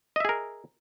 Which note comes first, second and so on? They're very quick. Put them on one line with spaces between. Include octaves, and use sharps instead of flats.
D#5 E5 G#4 A#4